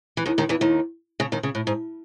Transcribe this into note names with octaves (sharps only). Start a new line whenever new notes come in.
E3
D#2 D#3
D#2 D#3
E2 E3
D#2 D#3
C#3
D#2 D#3
C#3
A2
G#2